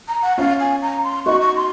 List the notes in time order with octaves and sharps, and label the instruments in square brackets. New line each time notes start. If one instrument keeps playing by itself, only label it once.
[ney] A#5
F#5
[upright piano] C#4 F4 [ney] F5
[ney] G#5
A#5
C6
[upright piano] D#4 F#4 [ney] C#6
[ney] C#6
C6